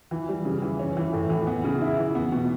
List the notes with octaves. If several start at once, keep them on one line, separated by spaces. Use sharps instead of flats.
E3
G3
C#3
E3
C#4
E3
A2
E3
B3
C#3
E4
E3
B3
B2